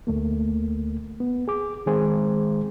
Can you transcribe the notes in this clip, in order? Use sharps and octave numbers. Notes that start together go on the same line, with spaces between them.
D2 A3 A#3
B3
G#4 D6
D#3 G#3 C4 G#4 C5